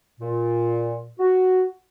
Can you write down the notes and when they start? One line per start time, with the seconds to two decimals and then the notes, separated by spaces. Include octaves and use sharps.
0.20 A#2
1.19 F#4